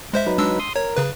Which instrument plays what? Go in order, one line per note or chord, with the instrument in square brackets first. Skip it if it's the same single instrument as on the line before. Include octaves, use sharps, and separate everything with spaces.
[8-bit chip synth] G#3 C5 E5
[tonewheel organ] F#3 D#4 B4
[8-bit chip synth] G#3 D4 E6
[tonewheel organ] C6 D#6
[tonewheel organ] A#4 [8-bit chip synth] C#5
[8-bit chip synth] C#3 B4